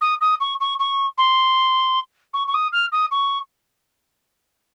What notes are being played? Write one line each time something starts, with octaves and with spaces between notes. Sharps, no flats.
D#6
D#6
C#6
C#6
C#6
C6
C#6
C#6
D#6
F6
D#6
C#6